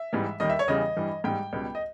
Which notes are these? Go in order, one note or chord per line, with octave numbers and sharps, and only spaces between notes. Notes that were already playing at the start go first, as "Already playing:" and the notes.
Already playing: E5
G#2 E3 G3
D#2 D#3 G3 D#5
E5
C#5
E2 C#3 E3 G3 D#5
G2 E3 G3
G#2 G3 G5
C#2 B2 G3
D#5